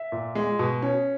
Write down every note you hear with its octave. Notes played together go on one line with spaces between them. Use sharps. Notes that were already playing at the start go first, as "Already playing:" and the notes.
Already playing: E5
A#2
G#3
B2
C#4